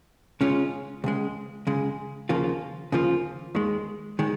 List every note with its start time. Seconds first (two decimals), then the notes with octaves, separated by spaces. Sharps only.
0.41 C#3 G#3 C#4 F4
1.04 C#2 C#3 G#3
1.67 C#2 C#3 G#3
2.29 D#2 C#3 F3 A#3 F4
2.92 D#2 C#3 F3 A#3 F4
3.55 D#2 D#3 G#3
4.19 D#3 G#3